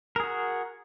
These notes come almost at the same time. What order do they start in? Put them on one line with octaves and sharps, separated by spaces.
A#4 G#4 F#4